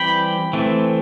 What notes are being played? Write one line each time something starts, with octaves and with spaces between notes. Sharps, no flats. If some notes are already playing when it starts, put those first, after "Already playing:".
Already playing: E3 G3 C4 G5 B5
E3 A3 C4